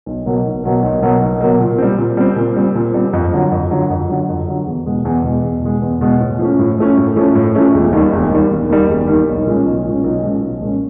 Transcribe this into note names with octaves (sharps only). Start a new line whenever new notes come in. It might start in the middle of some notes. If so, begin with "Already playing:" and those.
B1
B2 F#3 A#3
B1
B2 F#3 A#3
B1
B2 F#3 A#3
B1
B2 F#3 A#3
A#2
G3 C4
A#2
G3 C4
A#2
G3 C4
A#2
G3 C4
F2
D3 F#3
F2
D3 F#3
F2
D3 F#3
F2
D3 F#3
E2
B2 G#3
E2
B2 G#3
E2
B2 G#3
E2
B2 G#3
A2
F3 A3 C#4
A2
F3 A3 C#4
A2
F3 A3 C#4
A2
F3 A3 C#4
E1
D#2 D#3 G3
E1
D#2 D#3 G3
E1
D#2 D#3 G3
E1
D#2 D#3 G3
B1
A#2 F3 G#3 C#4
B1
A#2 F3 G#3 C#4
B1
A#2 F3 G#3 C#4
B1
A#2 F3 G#3 C#4